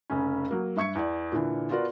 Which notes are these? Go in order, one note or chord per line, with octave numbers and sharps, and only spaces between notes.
F1 C#3 C#4
F#3 A#3
G2 E5 C#6 G#6 C#7
E2 D5
A#2 D3 E3
B3 F4 F#4 A#4 D5